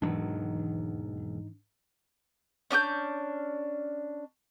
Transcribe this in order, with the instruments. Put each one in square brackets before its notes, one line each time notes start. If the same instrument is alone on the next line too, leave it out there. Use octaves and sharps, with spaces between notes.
[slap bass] E1 D#2 F#3 [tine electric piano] G#2 D#4 [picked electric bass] E3 D4
[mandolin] C#4 D4 C#6 G6